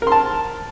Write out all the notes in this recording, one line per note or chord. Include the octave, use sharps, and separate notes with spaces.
A#4 A5 C6